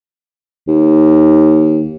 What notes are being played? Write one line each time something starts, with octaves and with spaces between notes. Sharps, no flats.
D#2